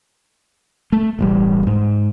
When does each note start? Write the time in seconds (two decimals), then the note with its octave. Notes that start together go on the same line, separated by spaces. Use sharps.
0.92 A3
1.19 E1 A1 G3
1.67 G#2